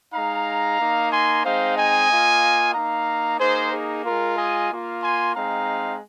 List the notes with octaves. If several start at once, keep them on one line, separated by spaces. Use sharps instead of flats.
G#3 D#4 F5 A#5
A#3 D#4
G#5 C6
G#3 C4 D#4 C5 F5
D#5 G#5
A#3 F4
A#3 D#4 F5 A#5
A#3 D#4 G#4 C5
G#4
G#3 F4 A#4
D#5 G#5
A#3 F4
G#5 C6
G#3 C4 D#4 F5 A#5